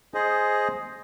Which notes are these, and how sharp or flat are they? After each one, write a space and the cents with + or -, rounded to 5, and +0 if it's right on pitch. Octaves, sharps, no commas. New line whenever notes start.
G#4 +10 C5 +0 D#5 +0